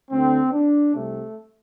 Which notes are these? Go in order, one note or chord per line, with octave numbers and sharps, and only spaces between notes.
D2 D3 C4
D4
C2 C3 A3